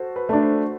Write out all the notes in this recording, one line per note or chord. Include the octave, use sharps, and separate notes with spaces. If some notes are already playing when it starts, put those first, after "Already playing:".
Already playing: F#4 A4 C5
B4
A3 D4
C5